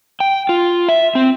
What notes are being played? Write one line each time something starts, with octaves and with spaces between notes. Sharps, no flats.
G5
F4
E5
C4